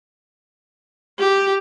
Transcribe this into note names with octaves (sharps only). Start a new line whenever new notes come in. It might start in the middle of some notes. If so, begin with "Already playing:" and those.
G4